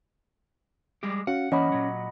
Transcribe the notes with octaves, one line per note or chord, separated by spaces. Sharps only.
G3 G#3 G4
C#4 F#4 F5 F#5
E3 A#3 C#4 D#5 F#5 B5
A#2 F#3